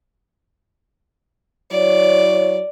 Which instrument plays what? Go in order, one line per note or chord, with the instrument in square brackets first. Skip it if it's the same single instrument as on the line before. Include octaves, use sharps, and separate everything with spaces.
[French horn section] F#3 E4 C#5 [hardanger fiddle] D5